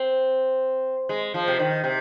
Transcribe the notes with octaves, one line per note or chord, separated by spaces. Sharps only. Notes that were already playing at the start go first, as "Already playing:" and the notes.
Already playing: C4
G#3
F3
C3
D#3
C3